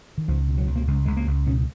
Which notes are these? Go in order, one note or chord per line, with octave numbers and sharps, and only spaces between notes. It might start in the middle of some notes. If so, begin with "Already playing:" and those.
D#3
C#2 F3
B2
F#3
C#2
A#3
C#2 G#3
C#2 G#3
A#3
C#2
B2 C#4